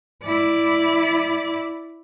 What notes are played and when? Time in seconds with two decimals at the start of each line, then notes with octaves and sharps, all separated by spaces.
0.23 E4 D5